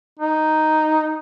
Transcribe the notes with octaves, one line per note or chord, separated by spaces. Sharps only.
D#4